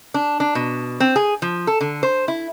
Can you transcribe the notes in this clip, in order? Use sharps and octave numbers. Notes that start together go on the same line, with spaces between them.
D4
D4
B2
C4
G#4
F3
A4
D3
C5
E4